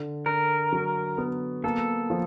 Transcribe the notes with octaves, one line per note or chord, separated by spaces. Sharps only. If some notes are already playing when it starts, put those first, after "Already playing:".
Already playing: D3
D3 A#4
F#3
B3
A#3 A4
F3